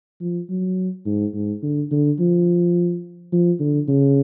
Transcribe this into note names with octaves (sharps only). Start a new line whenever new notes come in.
F3
F#3
G#2
G#2
D3
D3
F3
F3
D3
C#3